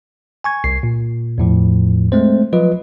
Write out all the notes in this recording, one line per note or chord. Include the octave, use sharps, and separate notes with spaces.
G#5 C#6 G#6
C2 C7
A#2
E2 A2 F3
G#3 A3 C4 C5
F3 F#3 F4 B4 D#5